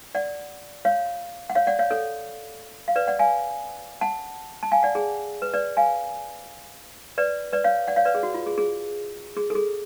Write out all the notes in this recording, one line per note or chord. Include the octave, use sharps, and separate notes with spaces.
D5 F#5
C#5 F5
F#5
C#5 F5
D5 F#5
C#5 F5
A4 C#5
F5
B4 D5
D5 F#5
F5 G#5
F#5 A5
A5
F5 G#5
D5 F#5
G#4
B4
B4 D5
F5 G#5
B4 D5
B4 D5
C#5 F5
D5 F#5
C#5 F5
B4 D5
G#4
F#4
F4
G#4
G#4
G#4
A4
G#4